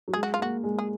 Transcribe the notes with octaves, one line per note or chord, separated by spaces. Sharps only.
F#3
G#3 G#4
F#4
F4
A#3 F#4
G#3
G#4